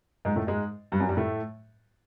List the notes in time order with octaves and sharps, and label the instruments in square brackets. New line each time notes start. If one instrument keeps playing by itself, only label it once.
[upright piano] G#2 G#3
A2 A3
G#2 G#3
G2 G3
F#2 F#3
G2 G3
A2 A3